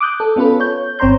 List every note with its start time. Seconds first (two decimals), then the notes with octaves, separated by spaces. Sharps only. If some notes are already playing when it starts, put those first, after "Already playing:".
0.01 D6 D#6 F#6 G6
0.20 A4
0.36 B3 C#4 F4 A4 B4
0.60 C#5 G6
0.99 G1 C4 C#5 A#5 C6 G6